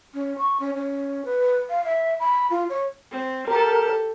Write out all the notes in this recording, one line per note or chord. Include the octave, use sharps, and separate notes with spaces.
C#4
C#6
C#4
C#4
B4
F5
E5
B5
F4
C#5
C4
G4 A4 A#4